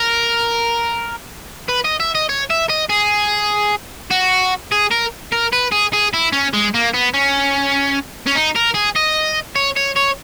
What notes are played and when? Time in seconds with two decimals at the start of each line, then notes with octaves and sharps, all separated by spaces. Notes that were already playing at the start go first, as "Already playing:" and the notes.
Already playing: A#4
1.68 B4
1.84 D#5
2.00 E5
2.15 D#5
2.29 C#5
2.50 E5
2.69 D#5
2.89 G#4
4.11 F#4
4.72 G#4
4.91 A#4
5.32 A#4
5.53 B4
5.72 G#4
5.93 G#4
6.14 E4
6.33 C#4
6.53 G#3
6.74 A#3
6.94 B3
7.14 C#4
8.27 C#4
8.36 D#4
8.56 A#4
8.75 G#4
8.96 D#5
9.56 C#5
9.76 C#5
9.96 C#5